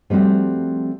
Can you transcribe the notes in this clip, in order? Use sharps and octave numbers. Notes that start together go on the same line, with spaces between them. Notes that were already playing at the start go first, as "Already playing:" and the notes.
F3 G3 A3 C4 F#4